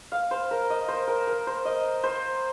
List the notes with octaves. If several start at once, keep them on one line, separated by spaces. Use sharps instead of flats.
F5
C5
A#4
D#5
C5
A#4
A#4
C5
D#5
C5